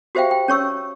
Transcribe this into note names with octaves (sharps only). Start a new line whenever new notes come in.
F#4 G4 C5 E5 F5 G5
G5
C#4 C#5 C#6 E6